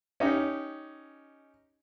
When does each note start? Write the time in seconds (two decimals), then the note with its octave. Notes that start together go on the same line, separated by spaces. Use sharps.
0.20 C#4 D#4 G4